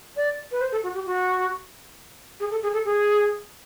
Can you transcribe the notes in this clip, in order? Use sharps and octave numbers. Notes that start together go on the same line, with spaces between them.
D5
B4
C5
A4
F#4
G4
F#4
G#4
A4
G#4
A4
G#4